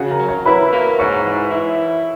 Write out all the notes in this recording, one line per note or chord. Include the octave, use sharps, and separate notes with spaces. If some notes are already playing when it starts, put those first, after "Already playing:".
Already playing: C#3 F#4 F#5
A#4 A#5
F#3
C#5 C#6
E4 B4 B5
A#3
G#2 C#5 C#6
E3
E4